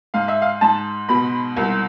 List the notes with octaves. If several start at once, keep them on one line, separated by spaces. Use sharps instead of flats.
G#2 F5
E5
F5
G#2 A5
B2 B5
C2